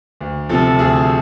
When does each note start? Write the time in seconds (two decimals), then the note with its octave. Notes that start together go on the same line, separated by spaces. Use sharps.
0.21 D2
0.49 C3 F3 A4
0.79 D2 G#4